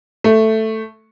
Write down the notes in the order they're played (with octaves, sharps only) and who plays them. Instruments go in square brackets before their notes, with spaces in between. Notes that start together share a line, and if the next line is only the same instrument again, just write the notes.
[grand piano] A3